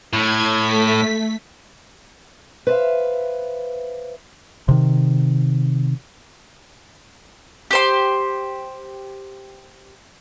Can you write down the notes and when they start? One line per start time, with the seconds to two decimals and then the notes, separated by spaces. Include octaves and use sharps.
0.13 A2 G#6
0.57 A3 B6
2.67 B4 C5 D5 E5 F5
4.69 C3 D#3
7.71 G4 C5 C6